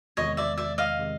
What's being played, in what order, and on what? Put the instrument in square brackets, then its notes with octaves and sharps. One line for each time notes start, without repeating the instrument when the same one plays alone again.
[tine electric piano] E2 C3 D#3 G#3 [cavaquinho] C#5 D#5
[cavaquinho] D5 E5
D5 E5
D#5 F5
[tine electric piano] C3 D#3 G#3